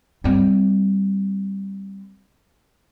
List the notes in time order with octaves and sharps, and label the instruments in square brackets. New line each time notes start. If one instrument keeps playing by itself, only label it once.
[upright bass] G3 C4